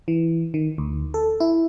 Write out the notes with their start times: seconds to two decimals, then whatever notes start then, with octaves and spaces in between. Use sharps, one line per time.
0.08 E3
0.54 D#3
0.78 D2
1.14 A4
1.40 E4